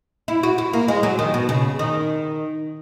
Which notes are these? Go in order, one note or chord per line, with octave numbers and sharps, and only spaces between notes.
E4
F#4
E4
A#3
G#3
F#3
D#3
B2
C#3
D#3